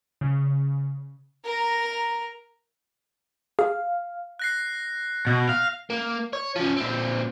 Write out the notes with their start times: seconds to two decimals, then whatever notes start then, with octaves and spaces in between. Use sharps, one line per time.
0.21 C#3
1.45 A#4 A#5
3.59 G#4 F5
4.39 F#6 A#6 C7
5.27 B2
5.49 F5
5.90 A#3
6.33 C#5
6.56 F3 C#4
6.76 A#2 C4